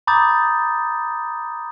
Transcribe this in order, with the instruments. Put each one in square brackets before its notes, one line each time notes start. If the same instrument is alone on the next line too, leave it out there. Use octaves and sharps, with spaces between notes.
[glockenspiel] A#5 B5 D6 D#6 G6 A6